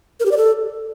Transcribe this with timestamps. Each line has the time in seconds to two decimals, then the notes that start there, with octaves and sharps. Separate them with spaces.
0.20 A#4
0.26 G4
0.31 D5
0.37 A4